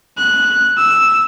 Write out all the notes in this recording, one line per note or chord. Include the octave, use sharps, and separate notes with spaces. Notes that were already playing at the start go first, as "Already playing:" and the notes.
F#6
E6